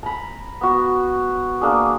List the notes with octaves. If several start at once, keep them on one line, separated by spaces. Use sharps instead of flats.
A#5 B5
B3 F#4
A#3 D4 G#4